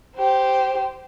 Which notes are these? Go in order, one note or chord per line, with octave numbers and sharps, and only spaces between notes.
G4 C5